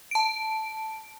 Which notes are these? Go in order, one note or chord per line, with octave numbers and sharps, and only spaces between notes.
A5 D7